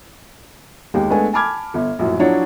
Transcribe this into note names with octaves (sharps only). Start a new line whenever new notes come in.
D#2 G#3 G4 G5
G#3 A3 B3 D4 G#5
G#5 A5 B5 D6 F6 G#6
G1
A#1 F#2 A2
F3 F#3 D4 E4 C#5